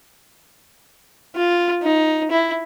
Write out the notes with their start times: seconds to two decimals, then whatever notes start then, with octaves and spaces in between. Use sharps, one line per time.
1.35 F4
1.82 D#4
2.31 E4